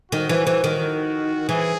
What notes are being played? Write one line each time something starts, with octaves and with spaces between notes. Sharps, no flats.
D#3 F#4
E3
E3
D#3
E3 G#4